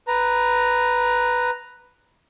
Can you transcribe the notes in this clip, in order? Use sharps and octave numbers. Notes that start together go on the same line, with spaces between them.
B4 A#5